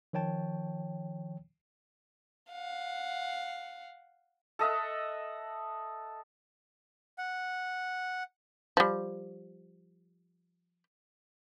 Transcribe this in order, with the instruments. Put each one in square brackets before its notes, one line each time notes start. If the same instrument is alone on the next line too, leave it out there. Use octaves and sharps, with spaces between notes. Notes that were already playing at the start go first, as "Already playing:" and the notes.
[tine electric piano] D#3 F3 C#5 G5 A5
[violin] F5 F#5
[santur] A4 D#5 E5 F#5
[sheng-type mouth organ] F#5
[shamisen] F3 G3